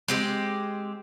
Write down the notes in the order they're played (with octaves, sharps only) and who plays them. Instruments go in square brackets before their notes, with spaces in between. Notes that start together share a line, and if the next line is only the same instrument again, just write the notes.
[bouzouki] G#3 C4 G4